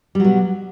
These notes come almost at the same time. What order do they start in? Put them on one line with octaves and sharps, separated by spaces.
G3 F#3 B2